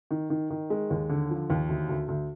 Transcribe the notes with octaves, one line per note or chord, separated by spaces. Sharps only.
D#3
D#3
D#3
G#3
D#2
D3
F3
D#2
D2
D2
D2